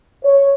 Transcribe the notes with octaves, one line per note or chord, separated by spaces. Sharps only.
C#5